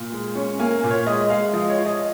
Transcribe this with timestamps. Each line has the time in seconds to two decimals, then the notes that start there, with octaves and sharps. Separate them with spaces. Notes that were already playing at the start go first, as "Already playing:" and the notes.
Already playing: A#2
0.12 G#3
0.35 C#4
0.59 A#3 G#5
0.83 A#2
0.90 C#5
1.06 G#3 D#5
1.30 G#3 F5
1.53 F3 D#5
1.69 C#5
1.77 F4
1.86 D#5